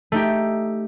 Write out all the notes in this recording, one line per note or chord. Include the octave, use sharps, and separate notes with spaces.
A3 D#4 G4